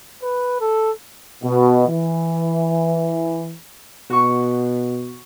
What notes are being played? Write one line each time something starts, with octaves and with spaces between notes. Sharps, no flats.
B4
A4
B2
E3
B2 F#4 C#6